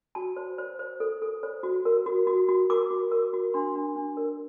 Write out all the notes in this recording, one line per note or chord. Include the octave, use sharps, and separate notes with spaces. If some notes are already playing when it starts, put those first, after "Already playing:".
F#4 A5
C5
C5
C5
A4
A4
C5
F#4
A#4
F#4
F#4
F#4
A#4 D6
F#4
A#4
F#4
D4 C6
D4
D4
A#4